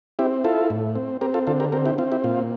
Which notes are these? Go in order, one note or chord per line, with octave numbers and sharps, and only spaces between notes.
C4 E4 G4
E4 F4 A4
A2
C4
C4 G4 A#4
F4 A4
D3 F4 A4
G4 A#4
C4 G4 A#4
E4 G4
C4 F4
E4 G4
A#2 F4